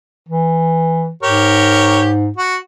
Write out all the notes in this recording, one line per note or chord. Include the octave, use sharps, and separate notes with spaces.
E3
G#2 G4 A#4 C#5
F#4